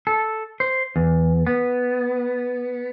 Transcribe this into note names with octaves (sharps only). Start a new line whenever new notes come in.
A4
C5
E2
B3